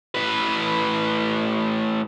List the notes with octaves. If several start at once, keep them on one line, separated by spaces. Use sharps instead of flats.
A2 B4